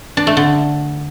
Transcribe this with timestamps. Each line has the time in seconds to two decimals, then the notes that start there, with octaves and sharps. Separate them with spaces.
0.17 D4
0.27 A3
0.37 D3